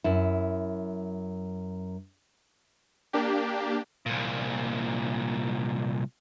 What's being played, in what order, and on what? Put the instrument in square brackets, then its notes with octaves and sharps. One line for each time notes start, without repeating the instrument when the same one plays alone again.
[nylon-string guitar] F#2 E4
[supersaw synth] A#3 D4 G4
[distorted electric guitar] C2 A#2